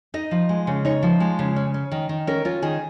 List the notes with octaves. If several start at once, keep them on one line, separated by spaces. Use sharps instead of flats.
D#4 D#5
F3
G#3
C#3
D#4 C#5
F3
G#3
C#3
C#4
C#4
D#3
D#3
C#4 A#4
C#4 F4
D#3 G#4